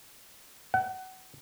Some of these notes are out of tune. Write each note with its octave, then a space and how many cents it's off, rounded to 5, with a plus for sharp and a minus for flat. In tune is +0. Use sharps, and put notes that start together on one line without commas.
F#5 +25